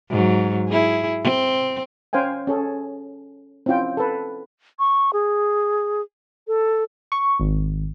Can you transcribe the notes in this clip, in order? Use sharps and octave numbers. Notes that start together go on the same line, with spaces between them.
G#2 F#3
E4 G#4
C4
C#4 C5 F5 G5 G#5
C#4 G#4 A4
C4 C#4 E4 F4 G5
A4 B4
C#6
G#4
A4
C#6
G#1